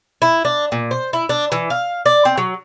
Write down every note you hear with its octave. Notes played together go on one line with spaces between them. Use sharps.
E4
D4
A#2
C5
E4
D4
E3
F5
D5
C4
F#3